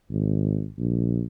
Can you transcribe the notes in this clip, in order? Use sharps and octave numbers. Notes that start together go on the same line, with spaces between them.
G#1
A#1